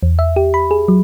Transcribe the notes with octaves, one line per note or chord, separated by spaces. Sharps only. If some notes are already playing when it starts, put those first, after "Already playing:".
E2
E5
G4
B5
G#4
F#3